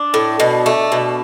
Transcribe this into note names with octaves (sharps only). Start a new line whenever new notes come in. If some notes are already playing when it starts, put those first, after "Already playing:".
Already playing: D4
A2
B2
A3
B2